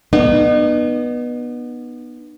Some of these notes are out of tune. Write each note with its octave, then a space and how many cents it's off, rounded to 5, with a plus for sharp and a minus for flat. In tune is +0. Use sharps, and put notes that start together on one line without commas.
B3 -15 D#4 -40